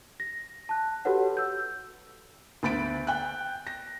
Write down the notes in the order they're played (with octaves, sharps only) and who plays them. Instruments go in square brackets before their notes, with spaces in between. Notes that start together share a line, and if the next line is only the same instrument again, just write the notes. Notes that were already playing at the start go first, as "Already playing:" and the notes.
[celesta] A#6
A5 F#6
F#4 G4 A4 B4 C#5 F#5
E6 G6
[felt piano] D2 B3 B5 A6 D7
G5 F#6
A#6